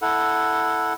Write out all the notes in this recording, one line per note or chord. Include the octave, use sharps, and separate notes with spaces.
E4 A4 F#5